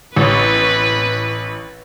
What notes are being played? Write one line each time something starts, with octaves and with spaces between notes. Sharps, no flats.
A1 B4 C#5